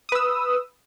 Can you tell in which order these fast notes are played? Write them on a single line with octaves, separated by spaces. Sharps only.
D#6 B4 E6